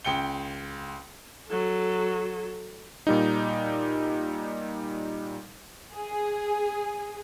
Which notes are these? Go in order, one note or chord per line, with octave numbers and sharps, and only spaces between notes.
C#2 G5 C#7 G7
F#3 A4
A#2 G3 D#4
G#4